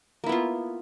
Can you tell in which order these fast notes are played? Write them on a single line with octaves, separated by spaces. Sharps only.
A#3 E4 B3 F4